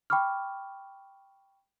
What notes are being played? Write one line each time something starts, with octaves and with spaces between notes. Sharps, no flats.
G5 B5 C#6 D6 F6